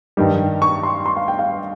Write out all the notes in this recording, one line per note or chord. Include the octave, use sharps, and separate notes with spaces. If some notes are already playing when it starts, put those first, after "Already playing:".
G2 D#3 G3
C#6
C6
C6
F5
G5
F5